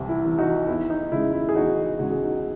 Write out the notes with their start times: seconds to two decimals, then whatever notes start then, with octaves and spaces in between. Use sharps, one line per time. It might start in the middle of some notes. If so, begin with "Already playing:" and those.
Already playing: C2 C3 E3
0.09 E4
0.25 C3 E3
0.39 D#4 F#4
0.67 E2 E4
0.90 D#4
1.12 C#3 G#3 E4
1.33 E4
1.49 G#4
1.55 E2 D#4 F#4
1.99 C#3 G#3 F#4
2.12 G#4
2.24 D#4 F#4